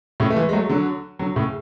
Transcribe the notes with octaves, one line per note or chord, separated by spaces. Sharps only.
A2 C#3
A3
E3 G#3
G#3
F#3 A3
D3 F#3
D3 F#3
A2 C#3